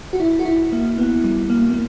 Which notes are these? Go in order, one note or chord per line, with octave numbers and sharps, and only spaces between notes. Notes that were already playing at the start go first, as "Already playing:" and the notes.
F#4
E4
F#4
E4
A#3
B3
G3
A#3
A#3